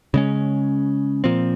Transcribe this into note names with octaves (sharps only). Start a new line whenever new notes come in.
C#3 G#3 C#4
A#2 F3 C4